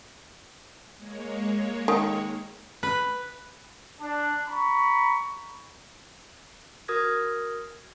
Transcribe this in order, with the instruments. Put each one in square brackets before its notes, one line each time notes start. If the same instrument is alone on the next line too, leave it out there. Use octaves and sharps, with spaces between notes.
[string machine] G#3 A#3 C#5
[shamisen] D#3
[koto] B4
[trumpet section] D4
A#5 B5 C#6
[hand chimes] F#4 A#4 D#6 F6 G#6 A#6